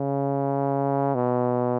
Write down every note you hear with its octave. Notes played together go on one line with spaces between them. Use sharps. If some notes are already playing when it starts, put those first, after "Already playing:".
Already playing: C#3
B2